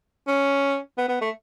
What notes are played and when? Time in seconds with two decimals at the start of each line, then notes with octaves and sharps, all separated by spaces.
0.27 C#4
0.98 B3
1.09 B3
1.21 A3